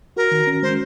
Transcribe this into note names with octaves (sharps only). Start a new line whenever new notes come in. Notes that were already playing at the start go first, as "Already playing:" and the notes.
F#4 A#4
D#3
C#4
G#3 C5